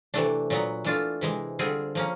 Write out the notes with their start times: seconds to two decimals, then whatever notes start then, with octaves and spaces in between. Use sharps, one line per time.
0.14 C3 E3 A3 D4
0.50 A#2 F#3 B3
0.84 E3 A3 D4 F4
1.21 C3 E3 G#3
1.59 D3 G3 C4 F4 G#4
1.95 F3 A#3 C#4